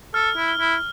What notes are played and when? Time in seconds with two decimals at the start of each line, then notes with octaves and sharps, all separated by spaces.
0.14 A4 F6
0.37 E4
0.48 G7
0.59 E4